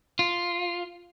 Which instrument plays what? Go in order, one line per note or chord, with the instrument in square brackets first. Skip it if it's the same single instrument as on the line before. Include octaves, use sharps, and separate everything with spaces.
[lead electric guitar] F4